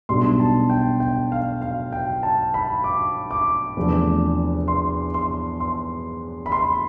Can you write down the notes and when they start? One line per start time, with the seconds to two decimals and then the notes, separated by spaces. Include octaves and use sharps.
0.09 B1 B2 G3 D4 C6
0.40 A5
0.70 G5
1.00 G5
1.32 F5
1.62 F5
1.92 G5
2.23 A5
2.54 B5
2.84 D6
3.31 D6
3.77 E2 C3 F3 A3 D4
4.68 C6
5.14 C6
5.60 C6
6.46 B5
6.52 C6